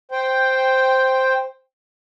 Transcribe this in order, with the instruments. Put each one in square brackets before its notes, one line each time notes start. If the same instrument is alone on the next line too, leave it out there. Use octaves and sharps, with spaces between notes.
[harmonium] C5 G5